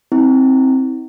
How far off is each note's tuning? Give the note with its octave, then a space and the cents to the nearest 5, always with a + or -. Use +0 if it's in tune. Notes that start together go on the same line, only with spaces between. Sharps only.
C4 +10 E4 -40